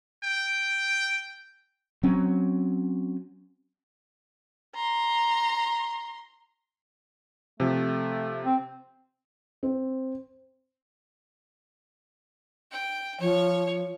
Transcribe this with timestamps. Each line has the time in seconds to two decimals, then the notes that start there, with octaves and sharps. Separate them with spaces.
0.24 G5
2.03 F#3 C4 C#4
4.75 A#5 C6
7.60 C3 F3 A3
8.45 C4
9.63 C4
12.71 G5
13.20 F3 C#5